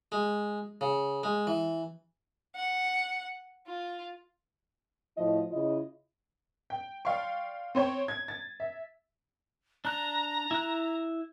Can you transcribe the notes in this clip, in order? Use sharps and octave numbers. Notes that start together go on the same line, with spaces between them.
G#3
C#3
G#3
E3
F#5
F4
A2 F3 E4 D#5
C#3 E4 F4 D#5
G5
D5 F5 G5 C6 C#6
C4 C5 C#5 G5
G#6
A6
E5
D4 A#5 F#6
E4 F#6